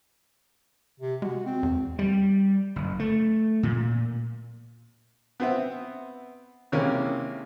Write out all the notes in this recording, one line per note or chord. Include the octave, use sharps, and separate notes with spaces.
C3
G#3 F#4
C4
E2
G3
F#1
A3
A#2
B3 C4 E5
C3 D#3 E3 G#3 A#3 C#4